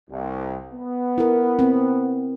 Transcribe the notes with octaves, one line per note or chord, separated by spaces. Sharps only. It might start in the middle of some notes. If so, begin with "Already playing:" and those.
C2
B3
E4 A#4
C4